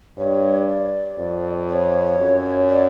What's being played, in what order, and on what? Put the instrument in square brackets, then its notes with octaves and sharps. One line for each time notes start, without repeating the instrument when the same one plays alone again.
[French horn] G2 [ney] C#5
[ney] D5
[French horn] F2
[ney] D5
C#5
[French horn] F#2
[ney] D5